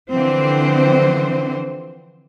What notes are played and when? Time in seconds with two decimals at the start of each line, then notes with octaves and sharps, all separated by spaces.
0.12 D3 E3 F3 C4 C5